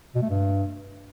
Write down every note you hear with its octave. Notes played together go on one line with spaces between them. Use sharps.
B2
A3
G2